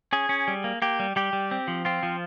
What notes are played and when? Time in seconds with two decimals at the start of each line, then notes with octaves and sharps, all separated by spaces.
0.13 C#4 G#4
0.29 C#4
0.48 G3
0.64 A#3
0.82 A#3 G4
0.99 G3
1.16 G3 G4
1.33 G3
1.51 C4
1.68 F3
1.85 C4 F4
2.03 F3